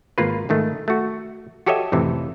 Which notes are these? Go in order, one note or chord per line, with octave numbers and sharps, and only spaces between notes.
G#1 A#3 F4 B4
G#2 D#3 A3
A3 F#4
F#4 G4 A4 C#5 D#5 E5
F2 A2 C3 E3